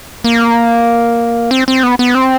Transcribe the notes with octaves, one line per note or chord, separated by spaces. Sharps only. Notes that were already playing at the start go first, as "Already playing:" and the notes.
A#3
C4
C4
B3
B3
C4